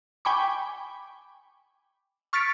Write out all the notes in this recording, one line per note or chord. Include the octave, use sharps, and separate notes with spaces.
G5 G#5 B5 C#6 D6
C#6 F6 A6 B6 C#7 D7